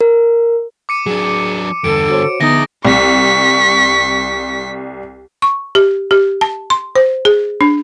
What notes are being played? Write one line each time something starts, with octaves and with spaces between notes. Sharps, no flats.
A#4
D6 C#7 D#7
F#3 D4 G#4
E2 G2 D3 A4 D7
F#4 C5 C#5
D3 B3 D#4 G#4 E5 A#6
C2 C#6 B6
C#6
G4
G4
A5
C6
C5
G#4
D4